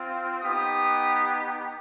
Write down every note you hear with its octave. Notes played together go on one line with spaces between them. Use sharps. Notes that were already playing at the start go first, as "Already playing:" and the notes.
Already playing: C4 F4
B3 D#4 G4 D#6